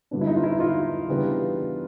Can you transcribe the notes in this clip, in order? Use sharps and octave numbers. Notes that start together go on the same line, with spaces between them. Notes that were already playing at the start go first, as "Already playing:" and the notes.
G2 D3 F#3 B3 D4
E4
D#4
F4
E4
D#4 F4
C#3 E3 G3 B3 D4